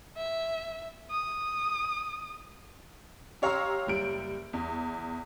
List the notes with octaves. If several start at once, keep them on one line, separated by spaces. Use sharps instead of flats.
E5
D#6
G4 C#5 F5 A#5 C6 E6
F#1 G3 D7
E2